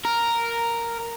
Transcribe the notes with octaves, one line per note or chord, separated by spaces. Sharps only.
A#4